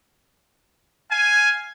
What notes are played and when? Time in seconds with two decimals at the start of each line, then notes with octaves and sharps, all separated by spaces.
1.11 F5 G#5